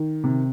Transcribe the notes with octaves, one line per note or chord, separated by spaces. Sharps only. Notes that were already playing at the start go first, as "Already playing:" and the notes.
Already playing: D#3
C3